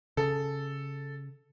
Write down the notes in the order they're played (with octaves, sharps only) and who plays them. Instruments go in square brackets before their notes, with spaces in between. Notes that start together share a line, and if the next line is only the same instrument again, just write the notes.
[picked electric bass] C#3 [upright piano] A4